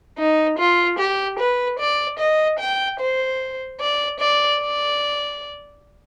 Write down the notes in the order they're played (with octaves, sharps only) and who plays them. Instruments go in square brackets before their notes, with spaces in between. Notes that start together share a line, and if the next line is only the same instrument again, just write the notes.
[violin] D#4
F4
G4
B4
D5
D#5
G5
C5
D5
D5
D5